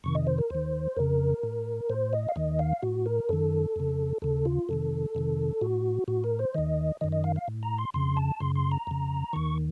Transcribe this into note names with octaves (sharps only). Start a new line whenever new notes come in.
F2 C3 D#3 C#6
D#5
C5
A#4
D#2 D#3 C5
F2 C#3 A#4
A2
A2 C5
D#5
F5
D#2 D#3 D#5
F5
A2 F#4
A#4
F#2 D#3 A4
F2 C#3
D#2 C#3 A4
F4
F2 C3 D#3 A4
F2 C3 D#3
A2 F#4
A2 F#4
A#4
C5
D#2 D#3 D#5
F#2 D#3 D#5
D#5
F5
F5
A2
A#5
C6
F2 C#3 C6
A5
F#2 C#3 C6
C6
A#5
F2 C#3
D#2 D#3 C#6